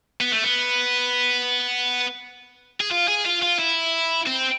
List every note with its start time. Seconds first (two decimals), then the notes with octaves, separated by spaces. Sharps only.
0.21 B3
0.32 A3
0.44 B3
2.80 G#4
2.91 F4
3.08 G#4
3.25 F4
3.42 F4
3.59 E4
4.27 C4